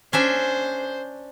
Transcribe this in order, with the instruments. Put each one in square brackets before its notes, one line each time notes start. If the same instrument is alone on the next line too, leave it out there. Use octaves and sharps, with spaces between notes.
[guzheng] C#4 D4 E5 [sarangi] C5